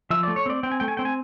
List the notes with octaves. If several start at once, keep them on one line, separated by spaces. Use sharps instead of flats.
F3 E5
D5
A3
C#5
C4 D5
C4 G5
G#5
A3 G5
G#5
C4 G5
G#5